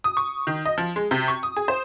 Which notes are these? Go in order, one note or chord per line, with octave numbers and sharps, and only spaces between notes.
D#6
C#6
D#3
D#5
F3
G#3
C3
C#6
D#6
G#4
C5